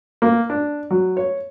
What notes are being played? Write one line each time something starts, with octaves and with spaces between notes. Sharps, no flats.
A#3
D4
F#3
C#5